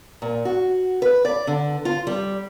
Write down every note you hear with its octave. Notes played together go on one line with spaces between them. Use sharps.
A#2
F#4
B4
D5
D3
F4
G3